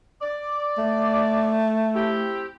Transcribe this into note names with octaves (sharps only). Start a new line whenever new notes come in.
D5
A3
C4 E4 G4